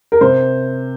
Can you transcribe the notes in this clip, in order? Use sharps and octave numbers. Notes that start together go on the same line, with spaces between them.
A#4
C3 C5